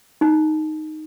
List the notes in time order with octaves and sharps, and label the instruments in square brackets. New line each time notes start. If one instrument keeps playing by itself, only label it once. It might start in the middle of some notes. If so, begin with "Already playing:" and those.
[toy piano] D#4